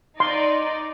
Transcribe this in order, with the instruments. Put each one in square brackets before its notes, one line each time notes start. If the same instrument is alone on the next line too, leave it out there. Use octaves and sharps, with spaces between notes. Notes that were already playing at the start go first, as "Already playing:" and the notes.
[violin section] D#4 D5 [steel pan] C6